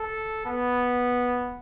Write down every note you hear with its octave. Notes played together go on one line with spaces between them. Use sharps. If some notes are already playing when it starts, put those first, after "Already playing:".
Already playing: A4
B3